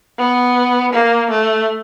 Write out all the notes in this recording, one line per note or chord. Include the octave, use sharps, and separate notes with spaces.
B3
A#3
A3